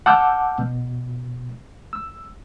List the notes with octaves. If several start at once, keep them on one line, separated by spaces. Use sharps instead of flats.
F#5 A5 D6 E6 F6 G6
B2
E6